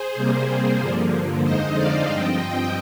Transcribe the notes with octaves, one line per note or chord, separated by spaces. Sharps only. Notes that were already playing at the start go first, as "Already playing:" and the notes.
Already playing: G#4 C5
C3 G3 A#3
G2 D3 F3 A#3
F2 D3 G#3 D#4 C5 D#5
D5 F5
G2 F3 C4 D#5 G5
D#5 G5